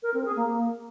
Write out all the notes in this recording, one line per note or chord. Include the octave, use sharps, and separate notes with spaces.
A#4
C4
G#4
A#3